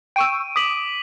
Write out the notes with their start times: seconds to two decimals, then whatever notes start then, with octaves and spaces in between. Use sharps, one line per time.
0.16 G5 C#6 E6 D7 D#7
0.56 D6 D#6 B6 F#7